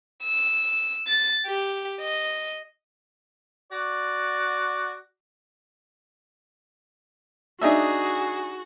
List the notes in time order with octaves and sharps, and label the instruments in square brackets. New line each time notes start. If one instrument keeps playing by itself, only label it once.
[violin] E6
A6
G4
D#5
[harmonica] F#4 D5
[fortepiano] D4 D#4 E5 [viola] F#4 [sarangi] G#4